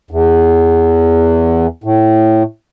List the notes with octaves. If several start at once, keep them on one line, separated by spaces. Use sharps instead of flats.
E2
A2